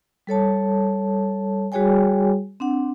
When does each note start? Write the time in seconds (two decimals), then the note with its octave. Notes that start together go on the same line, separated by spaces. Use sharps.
0.27 G3 A4 C#5 A5
1.72 G3 F#4 G#4 C#5 G5 G#5
2.60 C4 D4 F#5